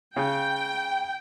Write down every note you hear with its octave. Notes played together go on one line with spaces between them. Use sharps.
C#3 G5